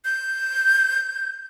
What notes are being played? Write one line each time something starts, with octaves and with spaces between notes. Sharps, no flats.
G6